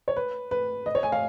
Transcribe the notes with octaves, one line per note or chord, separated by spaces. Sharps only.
C#5
B4
B4
D#5
C#5
G#5
F5